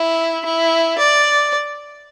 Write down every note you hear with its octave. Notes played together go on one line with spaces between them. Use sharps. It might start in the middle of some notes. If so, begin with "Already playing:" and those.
Already playing: E4
E4
D5